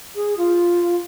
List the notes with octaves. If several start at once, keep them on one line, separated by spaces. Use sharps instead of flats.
G#4
F4